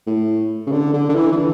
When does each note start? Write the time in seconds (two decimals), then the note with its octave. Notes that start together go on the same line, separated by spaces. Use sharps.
0.07 A2
0.67 C#3
0.72 D3
0.93 D3
1.09 D3
1.15 E3
1.32 E3
1.37 D3